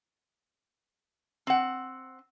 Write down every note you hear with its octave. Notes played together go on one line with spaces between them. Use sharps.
C4 F#5